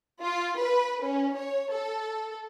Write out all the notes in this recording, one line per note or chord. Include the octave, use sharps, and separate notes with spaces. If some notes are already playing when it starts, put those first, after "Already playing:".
F4
B4
C#4
C#5
A4